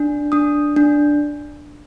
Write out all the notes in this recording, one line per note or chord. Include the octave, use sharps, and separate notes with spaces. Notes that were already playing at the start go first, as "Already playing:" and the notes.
Already playing: D4
D4 D#6
D4